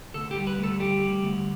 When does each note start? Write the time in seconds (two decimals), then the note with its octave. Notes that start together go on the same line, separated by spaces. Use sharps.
0.14 D2 A4
0.31 G4
0.36 G3
0.47 B4
0.58 D2
0.64 A4
0.80 G3 G4
1.01 G3
1.23 D2